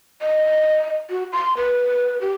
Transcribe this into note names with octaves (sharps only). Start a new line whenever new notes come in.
D#5
F#4
C6
B4
G4